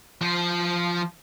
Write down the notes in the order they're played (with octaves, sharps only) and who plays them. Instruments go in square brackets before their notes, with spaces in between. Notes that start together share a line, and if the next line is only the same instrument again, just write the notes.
[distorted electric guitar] F3 C5